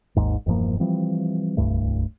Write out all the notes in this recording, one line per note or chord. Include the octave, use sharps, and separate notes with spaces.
G#1 D#2 G#2
E1 G2 F3 A#3
E3 F3 G3 C4
D1 C2 G2 A3